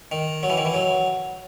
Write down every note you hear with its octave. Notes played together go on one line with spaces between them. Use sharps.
D#3
F#3
E3
D#3
E3
F#3